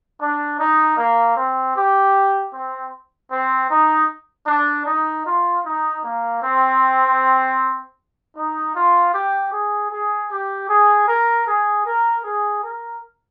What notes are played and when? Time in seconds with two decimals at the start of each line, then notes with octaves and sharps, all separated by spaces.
0.20 D4
0.59 D#4
0.97 A#3
1.37 C4
1.75 G4
2.54 C4
3.31 C4
3.70 D#4
4.47 D4
4.86 D#4
5.26 F4
5.64 D#4
6.03 A#3
6.42 C4
8.36 D#4
8.75 F4
9.14 G4
9.52 G#4
9.91 G#4
10.30 G4
10.69 G#4
11.08 A#4
11.47 G#4
11.85 A#4
12.25 G#4
12.63 A#4